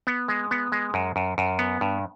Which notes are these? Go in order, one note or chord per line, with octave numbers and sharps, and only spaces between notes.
B3
G#3
B3
G#3
F#2
F#2
F#2
B3
G2